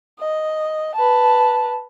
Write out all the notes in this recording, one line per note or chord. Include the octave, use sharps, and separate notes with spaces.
D#5
B4 A5